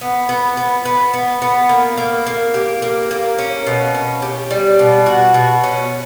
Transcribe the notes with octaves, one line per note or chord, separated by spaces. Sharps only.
B3
B3
B3
B3
B3
B3
A#3
A#3
A#3
G4
A#3
A#3
C#4
B2
C#4
G4
G3
B2
F#4
B2
C#4